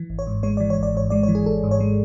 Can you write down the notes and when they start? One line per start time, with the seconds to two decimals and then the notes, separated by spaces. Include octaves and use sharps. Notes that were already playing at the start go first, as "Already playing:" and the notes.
Already playing: E3
0.10 G#1
0.19 C#5
0.27 G#2
0.43 G#3 C#5
0.57 E3 D5
0.70 C#5
0.78 G#1 D5
0.95 G#2 C#5
1.10 G#3 D5
1.23 C#5
1.28 E3
1.35 G#4
1.46 G#1 A4
1.64 G#2
1.71 C#5
1.80 G#3